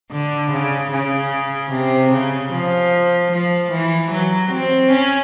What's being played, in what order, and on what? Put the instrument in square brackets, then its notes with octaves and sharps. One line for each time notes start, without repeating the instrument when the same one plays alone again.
[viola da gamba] D3
C#3
C#3
C3
C#3
F3
F3
E3
F#3
C4
C#4